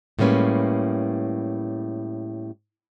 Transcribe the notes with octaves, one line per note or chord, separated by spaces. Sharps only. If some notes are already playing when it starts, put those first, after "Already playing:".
A2 G3 G#3 A#3 C#4 B4